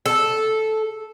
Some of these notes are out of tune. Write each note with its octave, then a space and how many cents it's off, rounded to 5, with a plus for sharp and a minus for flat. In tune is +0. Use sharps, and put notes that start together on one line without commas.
A4 -10